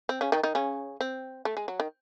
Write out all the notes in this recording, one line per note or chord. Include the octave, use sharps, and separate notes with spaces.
C4
C#3 C#4
D#3 D#4
D#3 D#4
C#3 C#4
C4
A3
G#3
F#3
D#3